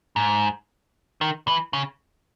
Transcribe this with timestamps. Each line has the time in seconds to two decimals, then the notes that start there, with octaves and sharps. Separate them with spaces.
0.16 G#2
1.21 D#3
1.48 E3
1.73 C#3